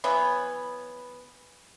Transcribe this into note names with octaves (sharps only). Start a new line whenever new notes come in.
E3 F#3 B3 C#5